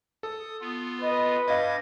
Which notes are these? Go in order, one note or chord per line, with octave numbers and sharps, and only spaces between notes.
A4 D#6
B3 F4
B4 D#5
G2 D#5 F5 D6 G#6 A#6